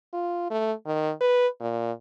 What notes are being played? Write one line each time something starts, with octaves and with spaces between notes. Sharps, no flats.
F4
A3
D#3
B4
A#2